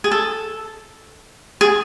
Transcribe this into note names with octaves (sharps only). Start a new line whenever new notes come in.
G#4
A4
G#4